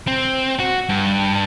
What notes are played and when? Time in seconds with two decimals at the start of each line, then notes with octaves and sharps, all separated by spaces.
0.07 C4
0.60 F#4
0.89 G2